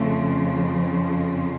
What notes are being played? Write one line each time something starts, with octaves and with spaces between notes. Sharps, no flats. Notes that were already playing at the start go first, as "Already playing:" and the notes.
Already playing: F2 C#3 F3 A3